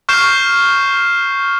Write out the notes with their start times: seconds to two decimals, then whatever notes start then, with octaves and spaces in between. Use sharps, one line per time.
0.09 C#6 F6 G6 C7 E7